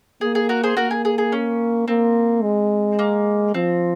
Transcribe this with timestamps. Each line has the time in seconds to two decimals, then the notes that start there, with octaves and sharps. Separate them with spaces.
0.21 A#3 G#4
0.35 G#4
0.49 F#4 A#4
0.63 G#4 C5
0.77 A#3 F#4 A#4
0.91 G#4
1.05 G#4
1.18 G#4
1.32 C#4
1.88 A#3 C4
2.43 G#3
2.99 A#3
3.54 F3 C4